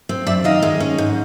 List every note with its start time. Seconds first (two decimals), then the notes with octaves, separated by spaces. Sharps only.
0.09 C4
0.27 F#2 D5 E5
0.44 D#3 D#5 F5
0.63 G#3
0.80 C#4
0.98 G#2